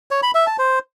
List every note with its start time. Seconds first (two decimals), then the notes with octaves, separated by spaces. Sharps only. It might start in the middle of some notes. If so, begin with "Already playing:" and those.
0.11 C#5
0.23 B5
0.35 E5
0.47 A5
0.59 C5